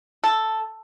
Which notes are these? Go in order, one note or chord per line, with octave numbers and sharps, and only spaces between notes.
A4